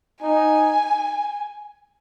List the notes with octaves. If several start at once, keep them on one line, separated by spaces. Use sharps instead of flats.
D#4 G#5